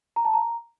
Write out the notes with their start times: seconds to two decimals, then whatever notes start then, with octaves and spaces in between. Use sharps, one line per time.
0.16 A#5
0.25 A5
0.34 A#5